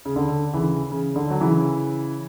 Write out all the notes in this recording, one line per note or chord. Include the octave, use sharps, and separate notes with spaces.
C#3
D3
C#3 E3
C#3
D3
F#3
C#3 E3